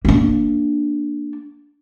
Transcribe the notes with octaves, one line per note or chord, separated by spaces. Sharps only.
A#3 D4